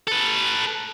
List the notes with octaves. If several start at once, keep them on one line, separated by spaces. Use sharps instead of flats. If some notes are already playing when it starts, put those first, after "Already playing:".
A4 B4